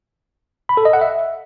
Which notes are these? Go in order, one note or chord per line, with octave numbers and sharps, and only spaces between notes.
B5
A4
D#5
F#5
E5